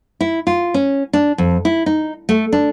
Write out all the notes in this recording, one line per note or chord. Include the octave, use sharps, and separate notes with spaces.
E4
F4
C#4
D4
F2
E4
D#4
A3
D4